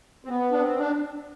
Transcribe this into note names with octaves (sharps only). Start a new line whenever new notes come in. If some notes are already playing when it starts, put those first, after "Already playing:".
C4
B3
D4
C4
D4